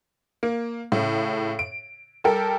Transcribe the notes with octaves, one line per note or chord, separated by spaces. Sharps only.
A#3
A2 C#3
D7
G3 G4 A4 A#4 G5